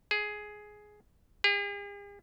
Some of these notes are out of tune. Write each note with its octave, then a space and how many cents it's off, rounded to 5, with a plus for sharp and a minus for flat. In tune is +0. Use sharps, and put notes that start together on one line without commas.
G#4 +10
G#4 -45